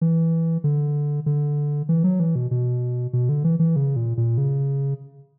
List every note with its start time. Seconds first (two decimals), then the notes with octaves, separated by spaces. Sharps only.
0.01 E3
0.64 D3
1.26 D3
1.89 E3
2.04 F#3
2.20 E3
2.35 B2
2.51 B2
3.13 B2
3.29 D3
3.44 E3
3.59 E3
3.76 C#3
3.96 A#2
4.17 A#2
4.38 C#3